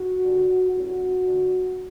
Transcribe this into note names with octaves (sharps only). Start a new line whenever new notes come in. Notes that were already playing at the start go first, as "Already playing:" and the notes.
Already playing: F#4
D3 G3 D4
A2 E3 G3 C#4 F#4
D3 A3 D4